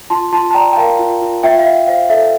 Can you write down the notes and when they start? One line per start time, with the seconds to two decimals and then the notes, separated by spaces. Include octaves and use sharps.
0.10 F4 A5 C6
0.32 F4 A5 C6
0.50 A5
0.54 D5 G5 A#5
0.72 G5
0.76 A#4 F5 A5
0.99 F4
1.21 F4
1.43 F4 E5 G5
1.58 F5
1.65 F4 E5
1.87 C5 F5
2.09 A4 E5